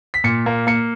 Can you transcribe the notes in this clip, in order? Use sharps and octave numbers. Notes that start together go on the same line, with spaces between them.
B6
A#2 C#7
A#3
A#3 C#7